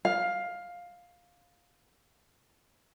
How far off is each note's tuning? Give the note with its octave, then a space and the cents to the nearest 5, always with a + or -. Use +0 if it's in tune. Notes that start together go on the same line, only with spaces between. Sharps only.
F5 +10